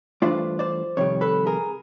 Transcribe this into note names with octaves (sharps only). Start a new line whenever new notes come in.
G2 E3 A3 D4 F4 C5 D5
C5 D5
F2 C3 D#3 G3 C#5
A4 B4
G#4 A#4